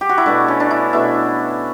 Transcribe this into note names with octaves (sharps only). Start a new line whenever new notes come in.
G4
F#4
E4
B2 A3 D4
C#4
D4
E4
B2 A3 E4